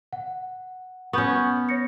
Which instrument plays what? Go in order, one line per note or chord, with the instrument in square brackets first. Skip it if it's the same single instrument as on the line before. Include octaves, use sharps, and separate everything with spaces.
[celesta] F#5
[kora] B3 C#4 [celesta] C#6 G6
[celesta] C#5 A#6 C#7